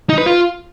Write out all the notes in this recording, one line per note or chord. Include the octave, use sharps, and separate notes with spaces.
D#4
B4
F4